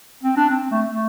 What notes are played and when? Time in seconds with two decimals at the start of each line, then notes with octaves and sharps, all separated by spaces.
0.23 C4
0.37 D4
0.50 C4
0.71 A3
0.90 A3